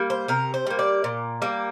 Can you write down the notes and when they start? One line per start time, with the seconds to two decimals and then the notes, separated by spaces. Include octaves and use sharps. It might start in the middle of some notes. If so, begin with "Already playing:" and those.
Already playing: G3 A#3
0.10 C5
0.28 C3 A#4
0.54 C5
0.67 G3 A#3
0.79 D5
1.04 A#2
1.42 G3 A#3